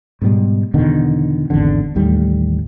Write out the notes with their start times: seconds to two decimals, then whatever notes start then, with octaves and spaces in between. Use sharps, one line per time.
0.22 G#2 B2 G3
0.74 E2 B2 D3 D#3
1.50 G#1 E2 D3
1.95 A1 D#2 G3 A3